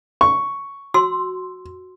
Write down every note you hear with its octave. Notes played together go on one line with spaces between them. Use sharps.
C#6
F#4 C6 E6